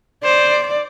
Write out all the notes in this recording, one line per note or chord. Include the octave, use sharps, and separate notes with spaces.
C5 D5